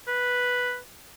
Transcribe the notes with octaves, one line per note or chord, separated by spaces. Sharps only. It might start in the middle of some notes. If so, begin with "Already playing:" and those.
B4